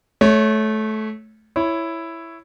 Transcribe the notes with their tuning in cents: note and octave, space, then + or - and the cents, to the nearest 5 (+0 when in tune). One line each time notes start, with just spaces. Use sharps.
A3 -20 C#5 +0
E4 +5 C#5 +0